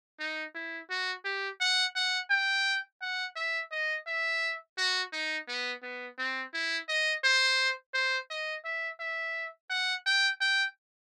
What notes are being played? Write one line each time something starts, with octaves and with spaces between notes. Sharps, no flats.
D#4
E4
F#4
G4
F#5
F#5
G5
F#5
E5
D#5
E5
F#4
D#4
B3
B3
C4
E4
D#5
C5
C5
D#5
E5
E5
F#5
G5
G5